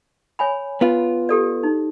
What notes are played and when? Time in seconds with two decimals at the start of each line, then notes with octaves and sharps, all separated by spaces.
0.39 C#5 G#5 B5
0.81 B3 F4
1.29 G4 A4 D5
1.63 D#4